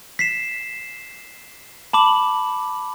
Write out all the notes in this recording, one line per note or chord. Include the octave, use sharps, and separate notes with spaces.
B6 C7 E7
A5 B5 D6 F#7